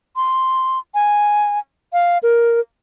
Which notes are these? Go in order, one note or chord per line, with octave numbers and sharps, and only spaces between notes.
C6
G#5
F5
A#4